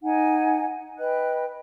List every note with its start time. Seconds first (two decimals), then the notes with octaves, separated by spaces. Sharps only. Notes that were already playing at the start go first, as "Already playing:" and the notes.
0.03 D#4 F#5 G#5
0.99 B4 D#5 G5 F#6